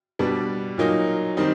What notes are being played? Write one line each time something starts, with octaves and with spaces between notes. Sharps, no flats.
B2 G3 B3 D4
A#2 F#3 A#3 D#4
D#3 G3 C4 D#4